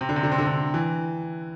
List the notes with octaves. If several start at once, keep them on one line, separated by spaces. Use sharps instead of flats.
C3
D3
C3
D3
C3
D3
C3
E3